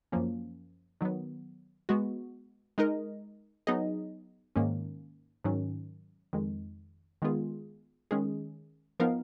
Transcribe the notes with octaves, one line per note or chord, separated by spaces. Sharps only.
F#2 F3 A#3 C#4
D#3 F#3 B3
G#3 B3 F#4
G#3 D#4 A#4 D#5
F#3 B3 D#4 G#4 D#5
G#2 D#3 A#3 C#4
G#2 D#3 F#3 C#4
F2 D#3 G#3
D#3 G#3 B3 F4 G#4
D#3 G#3 C#4 G#4
F3 B3 D#4 A#4 F5